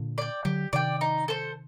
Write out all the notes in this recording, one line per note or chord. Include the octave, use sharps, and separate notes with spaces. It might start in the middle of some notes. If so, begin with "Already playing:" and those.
Already playing: A#2 D3
D5 G5
D3 F#3 G4
C3 D#3 D5 G5
D#4
A4 C5